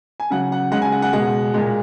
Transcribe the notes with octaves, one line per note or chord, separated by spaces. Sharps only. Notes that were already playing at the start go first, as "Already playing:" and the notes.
G#5
C#3 F#3 F#5
F#5
C#3 G#3 F#5
G#5
F#5
F#5
B2 G#3 F#5
A#2 G#3